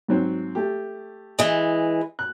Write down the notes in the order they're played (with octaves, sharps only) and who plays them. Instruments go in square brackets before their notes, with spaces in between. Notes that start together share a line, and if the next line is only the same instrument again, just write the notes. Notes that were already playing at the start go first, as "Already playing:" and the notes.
[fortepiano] G#2 F#3 C4
A3 G4
[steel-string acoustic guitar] E3 G#3
[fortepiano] F#6